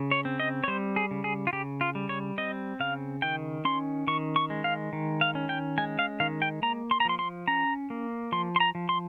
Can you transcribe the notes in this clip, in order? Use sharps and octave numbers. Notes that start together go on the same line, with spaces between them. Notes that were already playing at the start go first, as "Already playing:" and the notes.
Already playing: C#3
C#5
C4
D#5
C#5
G3 C5
G#4
C#3
G#4
F4
C#3 G4
F4
G3
C#5
C4 D#5
C#3 F5
D#3 G5
C#4 C6
D#3 C#6
C#6
G#3
F5
D#3
F5
C#4
G5
G#3 G#5
F5
D#3 F5
G5
A#3 A#5
C6
A#5
F3 C6
C6
C#4 A#5
A#3
F3 C6
C6
A#5
F3
C6